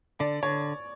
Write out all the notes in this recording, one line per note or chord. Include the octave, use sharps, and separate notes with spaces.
D3 D5
D3 C#5